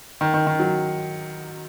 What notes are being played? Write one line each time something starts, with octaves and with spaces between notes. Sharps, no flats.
D#3
D#3
D#3
F#3